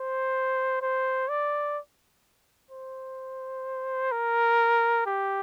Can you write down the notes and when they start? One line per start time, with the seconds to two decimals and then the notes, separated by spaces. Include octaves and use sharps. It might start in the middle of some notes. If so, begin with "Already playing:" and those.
Already playing: C5
0.82 C5
1.29 D5
2.71 C5
4.12 A#4
5.06 G4